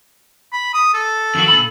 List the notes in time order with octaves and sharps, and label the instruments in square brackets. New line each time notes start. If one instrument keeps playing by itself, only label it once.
[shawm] B5
D#6
A4
[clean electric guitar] F2 D#3 F#4
A#2 D3 B5